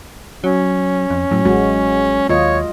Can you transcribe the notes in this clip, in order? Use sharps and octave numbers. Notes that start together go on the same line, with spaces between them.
F#3 C#4
F2
A2 F#3
A1 G#3 F#4
D#2 F4 C#5 D#5